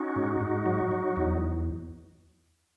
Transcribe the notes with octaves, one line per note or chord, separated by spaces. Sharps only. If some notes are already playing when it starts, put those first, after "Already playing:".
Already playing: C#4 D#4 F#4
G#2
G#2
F#3
F#3
E2 D#4